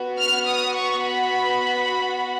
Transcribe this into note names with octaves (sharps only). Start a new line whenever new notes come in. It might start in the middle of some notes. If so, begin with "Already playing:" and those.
Already playing: B3 F#4
F6
D#6
C#6
B5